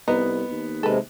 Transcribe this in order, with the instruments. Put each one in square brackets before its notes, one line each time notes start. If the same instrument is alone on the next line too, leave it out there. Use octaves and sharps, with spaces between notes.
[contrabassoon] C2 [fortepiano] B3 [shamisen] D#4
[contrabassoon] D#2
[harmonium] C3 G#3 [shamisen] A4 B4